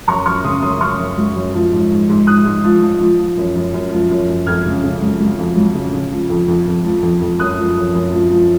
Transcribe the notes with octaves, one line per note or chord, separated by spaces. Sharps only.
F#2 A#5 C#6
F#2 C#6 F6
C#3 C6 D#6
F#2 C6 D#6
F#2 C#6 F6
F#2
F#3
F#2
F3
G#2
G#2
G#2
G#2 D#6 F#6
G#2
F3
F3
F3
F3
F#2
F#2
F#2
F3
F#2
F#2
F2 F6 G#6
C#3
C#3
F#3
F#3
F2
F#3
C#3
C#3
F3
F2
F2
F2
F3
F2
F2
F#2 D#6 F#6
F3
F#2
F#2
F3
F3